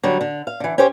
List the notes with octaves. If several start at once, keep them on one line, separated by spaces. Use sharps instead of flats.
D3 F#3 G3
D3
F5
D3 E3
C#4 G4 C5 C#5